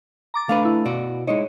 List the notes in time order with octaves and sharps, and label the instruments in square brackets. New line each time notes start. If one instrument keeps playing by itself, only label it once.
[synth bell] A#5 D6 A6
[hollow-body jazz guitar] A3 D4 B4 [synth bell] F5
[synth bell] E4
[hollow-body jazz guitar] B2 F#4 D5
[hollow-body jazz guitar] G#3 D#4 E4 [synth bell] C#5 D#5